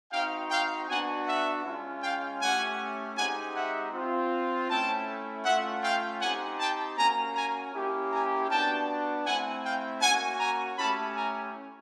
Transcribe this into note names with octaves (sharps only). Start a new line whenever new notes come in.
C4 D#4 F#4 F5 G5
F5 G5
B3 D4 F#4 F#5 G#5
E5 F#5
G#3 C#4 F4
F5 G5
A3 C#4 E4 G4 F#5 G#5
G#3 C4 D#4 G4 F#5 G#5
E5 F#5
C4 F4
A3 C#4 E4 G5 A5
A3 C#4 F4 E5 F#5
F5 G5
C4 D#4 G4 F#5 G#5
G5 A5
A#3 C#4 F#4 G#5 A#5
G#5 A#5
A#3 C#4 E4 G4
G#5 A#5
B3 D4 F#4 G5 A5
A3 C4 E4 F#5 G#5
F5 G5
A#3 C#4 F#4 F#5 G#5
G#5 A#5
A3 C#4 E4 G4 A5 B5
G#5 A#5